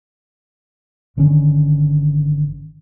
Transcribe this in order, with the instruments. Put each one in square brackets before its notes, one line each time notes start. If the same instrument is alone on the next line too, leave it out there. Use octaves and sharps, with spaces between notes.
[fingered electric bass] G1 D3 D#3 C#4